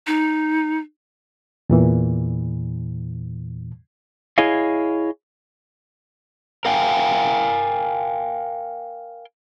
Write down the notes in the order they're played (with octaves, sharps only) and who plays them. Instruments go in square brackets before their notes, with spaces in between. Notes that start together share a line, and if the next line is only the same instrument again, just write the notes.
[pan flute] D#4
[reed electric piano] E2 A#2 E3
[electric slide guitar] E4 G#4 C#5 D#5 F5
A#4 F5 G5 G#5